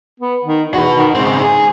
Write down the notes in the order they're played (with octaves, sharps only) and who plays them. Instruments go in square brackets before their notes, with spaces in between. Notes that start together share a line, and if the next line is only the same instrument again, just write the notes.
[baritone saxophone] B3
D#3
[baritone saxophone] E2 [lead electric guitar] F#4 B4
[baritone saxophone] D#3
[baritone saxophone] G#2 [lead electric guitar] C#3 C4
[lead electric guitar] G#4